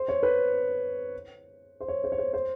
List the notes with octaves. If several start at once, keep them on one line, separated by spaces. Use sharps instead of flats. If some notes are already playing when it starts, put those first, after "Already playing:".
Already playing: C5
C#5
B4
C5
C#5
C5
C#5
C5
C5